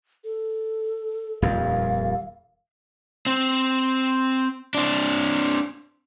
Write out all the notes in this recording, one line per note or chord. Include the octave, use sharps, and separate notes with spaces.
A4
D#1 F2 F5
C4
C4 D4